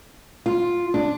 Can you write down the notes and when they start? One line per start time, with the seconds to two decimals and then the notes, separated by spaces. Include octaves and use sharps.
0.46 F4
0.94 D4